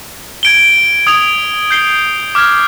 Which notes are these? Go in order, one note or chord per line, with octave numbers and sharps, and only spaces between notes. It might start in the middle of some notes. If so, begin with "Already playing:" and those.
G#6 D7 G7
D#6 G#6 D7 F7
G6 C7 G7
D6 F6 G#6